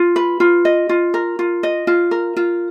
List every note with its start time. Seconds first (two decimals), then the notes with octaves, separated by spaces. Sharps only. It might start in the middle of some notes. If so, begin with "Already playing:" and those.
Already playing: F4
0.16 B4
0.40 F4
0.65 D#5
0.89 F4
1.14 A#4
1.39 F4
1.63 D#5
1.87 F4
2.11 A#4
2.36 F4